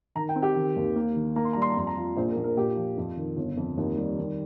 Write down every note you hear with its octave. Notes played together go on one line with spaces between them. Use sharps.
D#3 A#5
G5
C4
G4
D#3
D#2
A#3
D#3
A#3 A#5
C6
G3 A#5
C6
A#5
F2 C6
A#5
F3
A#1 C5
A#4
A#1
A#4
A#2 G4
F3
F2
D#3
G1
F2
D#2 D#4
G3
D#3